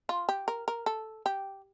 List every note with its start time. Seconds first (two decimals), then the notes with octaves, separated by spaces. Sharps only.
0.09 F4
0.29 G4
0.48 A#4
0.68 A#4
0.86 A4
1.26 G4